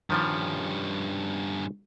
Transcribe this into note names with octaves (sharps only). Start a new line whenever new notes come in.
G2 D#3 F3 G3 C#4